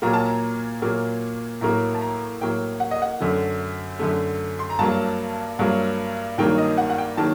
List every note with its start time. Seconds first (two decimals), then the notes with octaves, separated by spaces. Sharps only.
0.02 A#2 F#3 A#3 A#5
0.13 A5
0.25 A#5
0.82 A#2 F#3 A#3
1.61 A2 F#3 A#3 A#5
1.95 A5
2.01 A#5
2.41 A2 F#3 A#3 G5
2.80 F#5
2.91 D#5
3.02 F#5
3.20 F#2 D3 A3
3.99 F#2 D3 A3
4.59 C6
4.70 A#5
4.79 G2 F#3 A#3 A5
5.59 G2 F#3 A#3
6.38 G2 D#3 F#3 A#3 G5
6.58 D#5
6.78 F#5
6.90 F#5
6.98 G5
7.17 D#3 F#3 A#3 A5